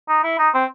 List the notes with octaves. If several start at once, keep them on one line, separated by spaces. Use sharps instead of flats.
D#4
E4
D#4
C4